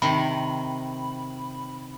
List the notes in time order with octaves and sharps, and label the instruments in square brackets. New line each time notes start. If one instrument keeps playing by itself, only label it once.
[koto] C3 D#3 [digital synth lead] B5